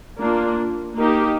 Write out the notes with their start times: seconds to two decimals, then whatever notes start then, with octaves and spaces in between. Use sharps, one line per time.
0.20 A#3 D4 F4
0.97 A#3 D#4 G4